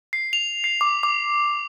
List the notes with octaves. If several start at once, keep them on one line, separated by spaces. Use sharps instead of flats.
C7
F7
C7
D6
D6